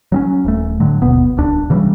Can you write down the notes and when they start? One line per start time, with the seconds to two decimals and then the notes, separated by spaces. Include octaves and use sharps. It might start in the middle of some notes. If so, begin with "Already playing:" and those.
0.12 F#3 C4 C#4
0.45 D#1 A3
0.80 A2 D3 F#3
1.02 G1 D#2 B2 B3
1.37 D1 C2 D4
1.70 C#3 E3 F#3 G3